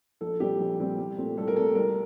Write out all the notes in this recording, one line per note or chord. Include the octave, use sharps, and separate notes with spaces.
A#1 A4
A#2 G3 C4 G4
A#1
A#2 G3 C4
C2
A#2 A3 C4
C2 A4
A#4
A#2 A3 C4 A4
C2 A#4